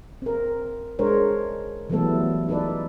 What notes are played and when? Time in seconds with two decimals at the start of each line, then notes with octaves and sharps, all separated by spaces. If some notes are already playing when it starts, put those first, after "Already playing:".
0.22 C4 A#4
0.99 G#3 D4 A#4 C5 C#5
1.90 E3 F#3 G3 A3 B3 A4
2.49 D#4 A4 B4 D5